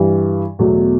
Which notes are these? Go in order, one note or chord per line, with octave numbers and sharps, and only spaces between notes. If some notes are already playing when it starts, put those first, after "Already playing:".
Already playing: G2 E3 G3
E2 B2 F#3 A3